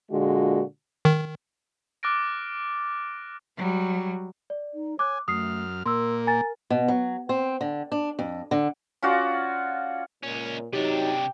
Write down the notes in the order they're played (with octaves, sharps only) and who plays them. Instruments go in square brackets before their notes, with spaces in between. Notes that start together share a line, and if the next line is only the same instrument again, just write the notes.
[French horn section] A#2 D3 G#3 F4 F#4
[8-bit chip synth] D#3
[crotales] D6 F6 F#6 A6 A#6 D7
[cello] F#3 G3
[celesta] D5
[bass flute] D#4
[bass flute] C#5 [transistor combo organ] G#5 [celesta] D6 F#6
[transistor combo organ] F#2 F6 [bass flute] A3 [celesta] D#6 C7
[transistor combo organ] A#2 A#3 [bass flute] A#4 [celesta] C6 E6
[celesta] G#5 A#5 A6
[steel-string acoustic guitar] B2
F#3
C4
D3
D4
F2
D3
[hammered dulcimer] C#4 F4 F#4 D5
[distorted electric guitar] C#2 C#4 [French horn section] A#2
[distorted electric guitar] C3 D4 [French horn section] F#3 D#4 [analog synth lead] G4